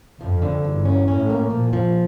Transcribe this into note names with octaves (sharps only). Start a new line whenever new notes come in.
F2 F3
D3
E2 G2
C#4
A2 C#4
A#3
A#2 F3
F3